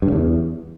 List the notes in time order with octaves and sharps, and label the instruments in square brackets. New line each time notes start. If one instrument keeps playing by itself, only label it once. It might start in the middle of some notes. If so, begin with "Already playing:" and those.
[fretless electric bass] G2
C#3
E2